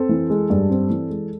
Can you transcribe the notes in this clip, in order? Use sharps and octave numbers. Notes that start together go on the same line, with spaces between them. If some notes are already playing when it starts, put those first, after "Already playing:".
Already playing: C4 A4
E3
G#3
G2
C4
E3
G#3